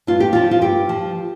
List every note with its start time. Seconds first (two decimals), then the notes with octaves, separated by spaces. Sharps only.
0.07 G2 F4
0.20 G4
0.33 F3 F4
0.51 F4
0.62 G2 G4
0.89 F3